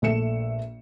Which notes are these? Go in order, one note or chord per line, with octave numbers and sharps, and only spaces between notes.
A#1 A3 E5 C#7 E7